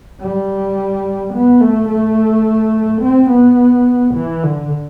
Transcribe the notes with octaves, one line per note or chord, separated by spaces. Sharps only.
G3
B3
A3
A3
C4
B3
E3
D3